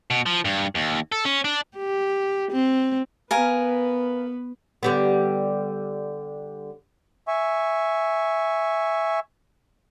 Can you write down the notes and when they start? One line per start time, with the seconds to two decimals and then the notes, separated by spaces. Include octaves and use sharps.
0.10 B2
0.26 F3
0.45 G2
0.75 D#2
1.12 A4
1.25 C#4
1.44 D4
1.77 G4
2.51 C4
3.31 B3 A#4 B4 F5 G#5
4.83 D3 G3 B3
7.28 E5 G#5 C#6